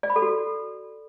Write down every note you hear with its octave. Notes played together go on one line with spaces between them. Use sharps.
D5
B5
A4
F#4